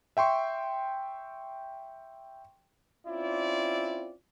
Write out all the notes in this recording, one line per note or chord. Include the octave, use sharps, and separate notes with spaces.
E5 G5 C6 C#6
C4 C#4 E4 F4 D5